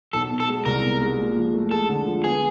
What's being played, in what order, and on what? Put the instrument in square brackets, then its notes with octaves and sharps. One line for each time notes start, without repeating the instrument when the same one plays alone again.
[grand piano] B1 [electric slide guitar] A4
[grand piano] B2
[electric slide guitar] A4
[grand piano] G#3
[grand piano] C2 [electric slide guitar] A#4
[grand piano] B2
G#3
A#2
F3
A3
[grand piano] G#3 [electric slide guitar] A4
[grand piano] D3
F3
[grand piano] B3 [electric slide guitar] G#4